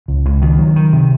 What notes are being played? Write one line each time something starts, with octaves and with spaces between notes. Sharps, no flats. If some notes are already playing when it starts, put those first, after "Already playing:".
C#2
C#2
D#3
F#3
D#3
C3